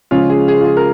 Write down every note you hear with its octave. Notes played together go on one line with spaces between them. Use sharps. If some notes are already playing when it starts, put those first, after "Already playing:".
C#3 F3 G#3 C#4 F4
G#4
G#4
F4
G#4
A#4